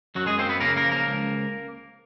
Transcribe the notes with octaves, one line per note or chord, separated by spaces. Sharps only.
F#2 F#3 F#4
G#3 G#4
A#3 C4 C5
B3 B4
C#3 A#3 A#4
A#3 A#4
F3
A#3 A#4
C#2